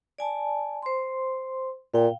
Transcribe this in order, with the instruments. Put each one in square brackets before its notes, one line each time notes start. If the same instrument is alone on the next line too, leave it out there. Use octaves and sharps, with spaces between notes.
[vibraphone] D5 G#5 A5
C5 C6
[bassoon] A#2 [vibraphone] F5 G5